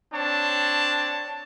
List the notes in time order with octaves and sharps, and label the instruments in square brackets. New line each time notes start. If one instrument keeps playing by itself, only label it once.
[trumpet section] C4 D4 C#5 A5